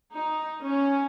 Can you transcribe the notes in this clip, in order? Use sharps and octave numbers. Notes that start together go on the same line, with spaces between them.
D#4
C#4